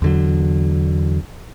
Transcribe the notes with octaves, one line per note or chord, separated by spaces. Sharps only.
E2 D3 F#3